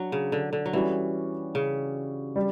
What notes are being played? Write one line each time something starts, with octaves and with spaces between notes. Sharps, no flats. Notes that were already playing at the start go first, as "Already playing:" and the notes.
Already playing: F#3 D4
C#3
D3
D3
F#3
E3 G3 C#4 F#4
C#3
G3